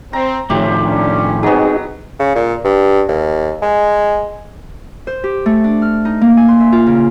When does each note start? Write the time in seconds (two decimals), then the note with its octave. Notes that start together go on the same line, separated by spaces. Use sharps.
0.13 C4 A#5
0.50 D2 A2 D#3 F3 G4 C#5
0.84 C#4 D4
1.43 G#2 F#3 B3 C4 D#4 G#4
2.19 C#3
2.36 A#2
2.65 G2
3.08 D#2
3.62 G#3
5.07 C5
5.24 G4
5.46 A3
5.64 D4
5.82 F6
6.05 D#4
6.21 A#3
6.37 G#5
6.48 C6
6.60 E5
6.72 F4
6.87 C#3